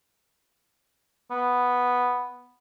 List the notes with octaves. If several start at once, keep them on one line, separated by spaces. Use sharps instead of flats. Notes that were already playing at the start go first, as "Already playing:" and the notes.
B3